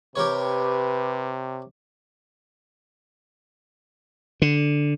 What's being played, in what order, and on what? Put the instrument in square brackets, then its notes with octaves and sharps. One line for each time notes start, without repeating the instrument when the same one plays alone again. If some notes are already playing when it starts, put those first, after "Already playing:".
[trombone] C3 [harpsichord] G4 A#4 C#5 [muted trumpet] B4
[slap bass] D3